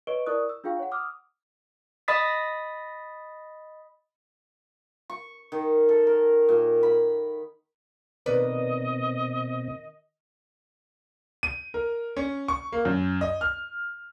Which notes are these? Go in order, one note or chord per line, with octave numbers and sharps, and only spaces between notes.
B4 C#5 D#5 C#6 D7 G7
E4 A#4 D5 C#6 D#6 F#6
E6
D4 F4 G#4 F5 G5 C#6
C#5 F#5
D6 D#6 F6
D#5 B5 D#6 A6 B6
C#6
D#3
A4
A#4
A#2
B5
B2 D#3 C4 B4 D5 D#5
D#7
A#4
C#4
C#6
A#3
F#2
D#5
F6